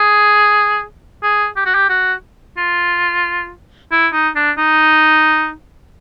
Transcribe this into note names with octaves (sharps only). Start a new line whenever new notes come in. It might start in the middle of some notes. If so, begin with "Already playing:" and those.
Already playing: G#4
G#4
G4
F#4
G4
F#4
F4
E4
D#4
D4
D#4